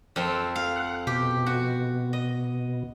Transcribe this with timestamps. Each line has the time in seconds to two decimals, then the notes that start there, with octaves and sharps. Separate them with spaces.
0.16 F2 C4 A4
0.56 F5
0.76 F#5
1.07 B2 G4
1.46 F#4
2.13 D#5